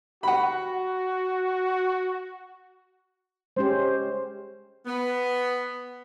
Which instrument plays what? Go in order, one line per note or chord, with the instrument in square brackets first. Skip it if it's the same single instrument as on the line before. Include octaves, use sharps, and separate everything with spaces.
[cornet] F#4 [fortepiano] F#5 B5
[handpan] G#3 C#4 G4 [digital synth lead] C5
[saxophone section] B3